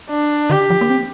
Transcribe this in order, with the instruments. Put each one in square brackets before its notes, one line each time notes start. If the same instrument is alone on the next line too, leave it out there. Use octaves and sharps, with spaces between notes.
[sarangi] D4
[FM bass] D3 [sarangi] G4
[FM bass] F3
A#3
C4